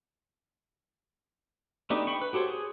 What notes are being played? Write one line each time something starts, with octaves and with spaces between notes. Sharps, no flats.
A3 B3 D4 D#4 G4
G5 B5 C#6
B4
F#4 G4 A4 C5 C#5
G#4